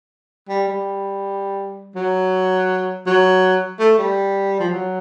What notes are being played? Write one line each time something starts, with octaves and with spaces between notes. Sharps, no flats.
G3
G3
F#3
F#3
A3
G3
F3
F#3